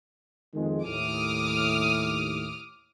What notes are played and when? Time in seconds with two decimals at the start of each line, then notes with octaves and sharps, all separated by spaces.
0.54 F2 D#3 G#3
0.84 D#2 A2 D6 D#6 F6